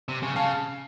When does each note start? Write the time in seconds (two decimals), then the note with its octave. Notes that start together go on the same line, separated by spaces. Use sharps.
0.09 C3
0.23 C#3
0.36 C#3 F5 A5